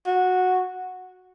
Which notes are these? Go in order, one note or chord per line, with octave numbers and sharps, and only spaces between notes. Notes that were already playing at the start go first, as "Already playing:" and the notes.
F#4